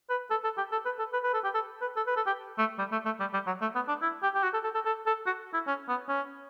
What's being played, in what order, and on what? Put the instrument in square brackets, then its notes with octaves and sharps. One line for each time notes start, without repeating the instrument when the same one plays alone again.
[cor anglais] B4
A4
A4
G4
A4
B4
A4
B4
B4
A4
G4
A4
B4
A4
B4
A4
G4
A3
G3
A3
A3
G3
G3
F#3
A3
B3
D4
E4
G4
G4
F#4
A4
A4
A4
A4
A4
F#4
E4
C#4
B3
C#4